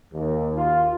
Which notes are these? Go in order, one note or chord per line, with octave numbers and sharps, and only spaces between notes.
D#2
F4